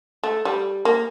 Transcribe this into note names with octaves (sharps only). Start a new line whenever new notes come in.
A3
G3
A#3